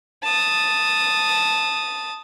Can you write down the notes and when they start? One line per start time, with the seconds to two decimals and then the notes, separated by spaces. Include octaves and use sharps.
0.23 A5 D#6